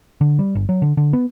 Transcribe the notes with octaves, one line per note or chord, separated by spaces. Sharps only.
D3
G3
G1
F#3
D3
D3
B3